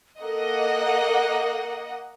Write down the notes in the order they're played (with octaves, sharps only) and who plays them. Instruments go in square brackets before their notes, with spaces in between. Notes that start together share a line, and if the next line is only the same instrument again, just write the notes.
[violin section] A#3 D#5 F#5 [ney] A4